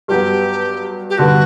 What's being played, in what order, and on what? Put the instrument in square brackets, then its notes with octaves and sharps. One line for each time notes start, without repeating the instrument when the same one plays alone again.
[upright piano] G2 F#3 B3 [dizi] G4
[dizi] G4
[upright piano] G2 D3 G3 B3 [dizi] F#4